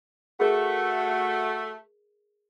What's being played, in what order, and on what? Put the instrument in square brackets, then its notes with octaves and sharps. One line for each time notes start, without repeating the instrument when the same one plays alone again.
[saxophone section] A3 [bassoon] F#4 [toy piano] G#4 A#4